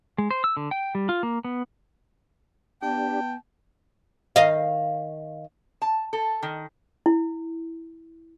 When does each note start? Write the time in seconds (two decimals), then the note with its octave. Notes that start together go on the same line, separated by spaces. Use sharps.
0.18 G#3
0.31 C5
0.44 E6
0.57 D3
0.71 G5
0.95 G3
1.09 F4
1.23 A#3
1.45 B3
2.82 B3 D4 G4 G5 A5
4.36 D#3 D#5 F5
5.82 A5
6.13 A4
6.43 D#3
7.06 E4